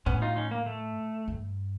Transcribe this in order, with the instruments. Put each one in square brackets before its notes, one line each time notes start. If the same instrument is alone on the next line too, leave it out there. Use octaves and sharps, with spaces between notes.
[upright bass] A2 [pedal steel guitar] B3 C#4
[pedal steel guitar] D#4 F4
C#4 D#4
A#3
A3
[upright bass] G2